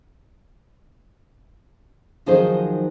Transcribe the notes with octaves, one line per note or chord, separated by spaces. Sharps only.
D#3 F3 F#3 D#4 G#4 C5